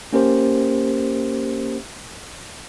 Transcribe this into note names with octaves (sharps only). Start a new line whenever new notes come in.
A#3 C#4 G4 A#4 C5